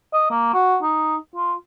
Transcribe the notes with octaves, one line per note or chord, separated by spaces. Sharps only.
D#5
A#3
F#4
D#4
F4